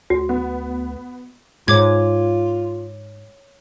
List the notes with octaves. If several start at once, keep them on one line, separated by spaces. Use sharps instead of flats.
D2 F#4
B3
G#2 F4 C#5 D6 G#6